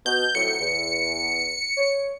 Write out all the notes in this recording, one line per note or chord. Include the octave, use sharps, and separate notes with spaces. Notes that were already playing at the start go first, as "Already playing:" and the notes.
B2 G6
F2 A2 F#3 C#7
E2
C#5